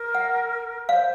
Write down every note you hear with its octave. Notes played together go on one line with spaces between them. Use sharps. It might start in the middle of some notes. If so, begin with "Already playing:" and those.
Already playing: A#4
F#5
C5 D5 F5